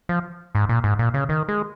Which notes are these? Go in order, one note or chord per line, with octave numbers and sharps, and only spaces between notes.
F3
G#2
A#2
G#2
A#2
C#3
D#3
G#3